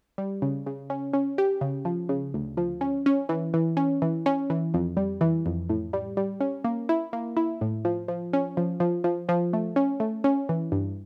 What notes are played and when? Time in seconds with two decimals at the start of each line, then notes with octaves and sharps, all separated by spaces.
0.18 G3
0.42 C#3
0.66 C#3
0.90 C#4
1.13 C#4
1.38 G4
1.61 C#3
1.85 F3
2.09 C#3
2.34 D2
2.57 F3
2.81 C#4
3.06 C#4
3.29 E3
3.54 E3
3.77 C#4
4.02 E3
4.26 C#4
4.50 E3
4.74 F2
4.97 G3
5.21 E3
5.46 F2
5.69 A2
5.93 G3
6.17 G3
6.41 C#4
6.64 A#3
6.89 E4
7.13 A#3
7.37 E4
7.61 A2
7.85 F3
8.08 F3
8.33 C#4
8.57 F3
8.80 F3
9.04 F3
9.29 F3
9.53 A3
9.76 C#4
10.00 A3
10.24 C#4
10.49 E3
10.72 G2